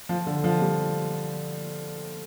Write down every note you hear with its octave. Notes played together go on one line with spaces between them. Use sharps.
F3
D3
F3
G3